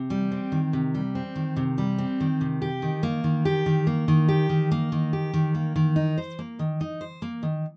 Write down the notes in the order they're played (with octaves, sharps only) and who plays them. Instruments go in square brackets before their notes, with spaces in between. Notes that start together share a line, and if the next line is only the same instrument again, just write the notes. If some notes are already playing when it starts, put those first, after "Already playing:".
Already playing: [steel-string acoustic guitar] C3
G3
C4
D#3
C3
G3
C4
D#3
C3
G3
C4
D#3
C3
G4
D#3
A#3
D#3
G4
D#3
A#3
D#3
G4
D#3
A#3
D#3
G4
D#3
A#3
D#3
D#4
C5
A#3
D#3
D#4
C5
A#3
D#3